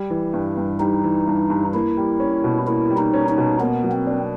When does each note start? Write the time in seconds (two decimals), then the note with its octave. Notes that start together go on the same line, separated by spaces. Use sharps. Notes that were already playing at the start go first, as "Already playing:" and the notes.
Already playing: G3
0.10 E3
0.33 G2
0.57 G2
0.80 G3 D#4
1.04 E3
1.27 G2
1.50 G2
1.74 A#3 E4
1.97 G3
2.20 C#4
2.44 B2
2.67 A#3 E4
2.90 G3
2.98 D#4
3.13 C#4
3.29 D#4
3.38 B2
3.60 A#3 B3
3.84 F#3
3.92 C4
4.07 D4